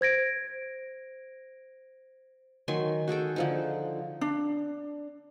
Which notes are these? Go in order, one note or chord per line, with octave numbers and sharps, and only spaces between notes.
C5 G#6 A#6 D7
D#3 F#3 G#5 C6
F#4 G#4 A4 G5
D3 F3 D#4
D4